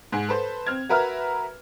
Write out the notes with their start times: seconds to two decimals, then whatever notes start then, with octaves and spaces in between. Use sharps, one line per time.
0.12 G#2 G#5
0.29 A4 B4 C5
0.66 C4 F6 G#6
0.89 F#4 A#4 B4 E5 A#5 F6